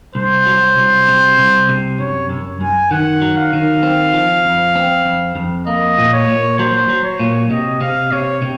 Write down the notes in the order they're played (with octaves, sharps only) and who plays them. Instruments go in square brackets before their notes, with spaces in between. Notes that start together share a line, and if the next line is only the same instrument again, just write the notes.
[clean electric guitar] C2 [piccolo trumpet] C5
[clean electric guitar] F#3
C2
C3
C2
C3
[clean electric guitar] F#2 [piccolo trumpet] C#5
[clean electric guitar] F#2
[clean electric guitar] F#2 [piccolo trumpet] G#5
[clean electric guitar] D#3 [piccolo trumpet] F#5
[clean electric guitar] F#3
[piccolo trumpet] F5
[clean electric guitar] D#3
C4
F3
F2
C4
F2
F2
[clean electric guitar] A#3 [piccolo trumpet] D#5
[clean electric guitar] A#2
[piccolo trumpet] C#5
[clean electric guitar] A#2
[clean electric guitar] F#3 [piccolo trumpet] C5
[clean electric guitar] F#3
[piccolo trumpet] C#5
[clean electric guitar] A#2
[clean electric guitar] C3 [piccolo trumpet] D#5
[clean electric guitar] C3 [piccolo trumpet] F5
[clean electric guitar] C3 [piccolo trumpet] C#5
[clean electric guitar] C3